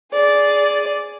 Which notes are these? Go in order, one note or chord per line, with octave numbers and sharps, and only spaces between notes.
G#4 D5